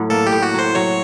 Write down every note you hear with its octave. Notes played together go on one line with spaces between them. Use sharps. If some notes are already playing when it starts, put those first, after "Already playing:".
Already playing: A2 F#3
A#3 A4
G4
A2
F#4
F#3 C5
F#3 C#5